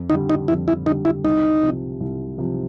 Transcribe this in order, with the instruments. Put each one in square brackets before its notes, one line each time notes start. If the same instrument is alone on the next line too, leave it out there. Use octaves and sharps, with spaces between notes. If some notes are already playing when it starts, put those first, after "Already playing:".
Already playing: [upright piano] F2
[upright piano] D3 G3 [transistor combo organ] D#4
[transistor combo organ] D#4
[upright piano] F2 [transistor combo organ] E4
[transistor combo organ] E4
[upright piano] D3 G3 [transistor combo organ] D#4
[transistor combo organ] E4
[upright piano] C2 [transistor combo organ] D#4
[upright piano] C3 F3
C2
C3 F3